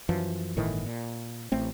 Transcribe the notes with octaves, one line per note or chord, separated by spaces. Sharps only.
F#2 E3 F3
G1 A2 D#3 E3
A#2
A1 A3 C4